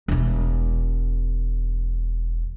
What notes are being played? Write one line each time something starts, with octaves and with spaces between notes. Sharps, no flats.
E1 E4